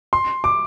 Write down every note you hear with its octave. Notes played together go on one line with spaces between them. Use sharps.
C6
D6